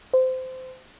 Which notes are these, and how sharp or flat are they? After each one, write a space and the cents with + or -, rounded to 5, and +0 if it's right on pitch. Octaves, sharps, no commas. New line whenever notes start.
C5 -20